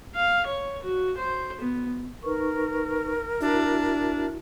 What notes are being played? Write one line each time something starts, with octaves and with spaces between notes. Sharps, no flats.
F5
C#5
F#4
C5
B3
D#4 A#4 B4 C#6
D4 E4 F#4 E5